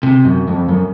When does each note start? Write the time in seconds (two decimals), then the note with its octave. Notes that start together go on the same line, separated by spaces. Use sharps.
0.03 C3
0.25 F#2
0.48 F2
0.69 F#2